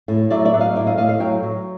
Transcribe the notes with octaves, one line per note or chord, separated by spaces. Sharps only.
A2
F#3 D5 E5
D5 E5
F#3
D#5 F5
A2 D5 E5
D#5 F5
A2 D#5 F5
D#5 F5
F#3 F5 G5
F#3